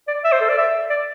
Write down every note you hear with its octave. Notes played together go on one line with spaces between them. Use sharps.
D5
E5
C5
A4
D5
E5
D5